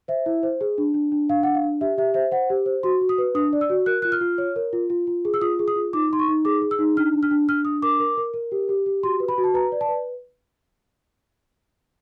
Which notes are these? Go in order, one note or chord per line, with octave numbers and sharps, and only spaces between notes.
C5 E5
E4
C5
G#4
D4
D4
D4
D4 F5
D4 F#5
F5
D4
G4 E5
G4 E5
C5 E5
C5 F#5
G4
C5
F#4 C6
F#4
D#6
B4
D4 D#6
D5
E6
F#4
A#4 F#6
F4 F#6
F6
F4
C#5
A#4
F4
F4
F4
G#4
E6
F4 D#6
G#4
D#6
F4
D#4 D6
D#4 C6
C#6
D#4
G#4 D6
G#4
E6
D#4
D4 F6
D4
F6
D4
D4 F6
D4 D#6
A#4 D6
A#4
A#4
A#4
G4
G4
G4
F#4 C6
B4
B5
F#4
A5
B4 A#5
D5
A5
B4